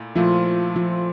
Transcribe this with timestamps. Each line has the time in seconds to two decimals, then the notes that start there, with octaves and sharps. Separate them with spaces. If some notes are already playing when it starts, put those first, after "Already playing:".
Already playing: A#2 A3 E4
0.16 A#2 F3 A3 E4 F4
0.76 F3 F4